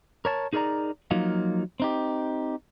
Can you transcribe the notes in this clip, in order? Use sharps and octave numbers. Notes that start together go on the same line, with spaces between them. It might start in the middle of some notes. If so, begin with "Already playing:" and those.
A#4 C#5 A5
D#4 G#4 A#4 C#5 D5 A#5
F3 F#3 A#3 D#4 F4
C4 D#4 G4